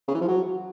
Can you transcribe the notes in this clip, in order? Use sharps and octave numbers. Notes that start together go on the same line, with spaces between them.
C#3
E3
F3
F#3